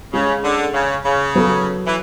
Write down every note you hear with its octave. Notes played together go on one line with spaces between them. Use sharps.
C#3 G#3 C#4 G#4
D3
C#3
C#3
F#3 B3 F#4 A4
E3